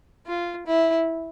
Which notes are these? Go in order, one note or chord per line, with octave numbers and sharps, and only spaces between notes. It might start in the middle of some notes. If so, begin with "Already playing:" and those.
F4
E4